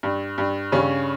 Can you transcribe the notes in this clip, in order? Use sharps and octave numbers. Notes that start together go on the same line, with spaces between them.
G2
G2
G2 C#3 C#4